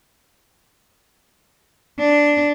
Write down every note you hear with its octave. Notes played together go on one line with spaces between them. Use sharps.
D4